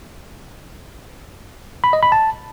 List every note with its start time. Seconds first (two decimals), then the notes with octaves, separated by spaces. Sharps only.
1.84 B5
1.93 D#5
2.03 B5
2.12 A5